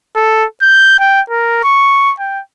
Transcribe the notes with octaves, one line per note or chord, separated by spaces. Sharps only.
A4
G6
G5
A#4
C#6
G5